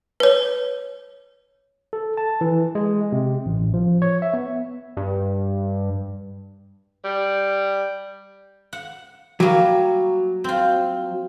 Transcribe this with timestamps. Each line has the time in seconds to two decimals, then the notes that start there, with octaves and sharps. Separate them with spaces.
0.20 B4 C#5
1.93 A4
2.17 A5
2.41 E3
2.75 G#3
3.12 C3
3.46 A1
3.60 A1
3.74 F3
4.02 C#5
4.22 E5
4.34 B3
4.97 G2
7.04 G3
8.73 F#5
9.40 F#3 G3 A#3
10.44 C4 F4